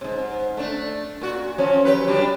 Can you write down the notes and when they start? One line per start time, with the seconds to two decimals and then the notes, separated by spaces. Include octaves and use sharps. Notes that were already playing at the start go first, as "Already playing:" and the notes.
0.01 G#2 C3
0.57 A3 D4
1.21 A#2 F#4
1.58 F3 F#3 C#4
1.85 F#3 G4 B4
2.07 F#3 G3 D4